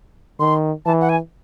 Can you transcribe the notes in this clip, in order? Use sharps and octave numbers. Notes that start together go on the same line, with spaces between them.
D#3 C6
E3 A5
F#5
G#5